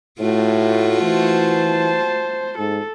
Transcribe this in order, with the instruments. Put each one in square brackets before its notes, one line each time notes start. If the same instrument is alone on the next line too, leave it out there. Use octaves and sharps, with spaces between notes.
[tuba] A2 [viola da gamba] A3 F4 F#4
[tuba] E3 [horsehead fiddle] C5 A5
[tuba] G#2 [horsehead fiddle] A4